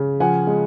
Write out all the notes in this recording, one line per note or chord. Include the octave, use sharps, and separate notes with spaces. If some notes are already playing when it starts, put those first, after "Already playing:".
Already playing: C#3
F3 F#5 G#5
G#3